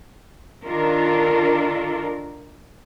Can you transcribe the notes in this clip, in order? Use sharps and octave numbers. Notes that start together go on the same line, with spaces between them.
D#3 D4 F4 A4 A#4